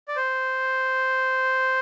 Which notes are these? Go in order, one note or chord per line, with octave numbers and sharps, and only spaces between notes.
D5
C5